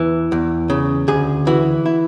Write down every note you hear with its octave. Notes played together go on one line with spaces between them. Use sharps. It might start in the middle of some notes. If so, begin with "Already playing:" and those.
Already playing: E2 E3
E2
C#3
D2 G#4
E3 F#4
E4